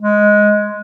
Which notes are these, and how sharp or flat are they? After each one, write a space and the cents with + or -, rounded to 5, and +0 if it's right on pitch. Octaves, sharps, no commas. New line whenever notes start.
G#3 +5